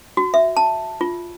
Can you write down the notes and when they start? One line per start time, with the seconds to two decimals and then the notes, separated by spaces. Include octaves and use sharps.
0.17 F#4
0.34 E5
0.57 A5
1.01 F4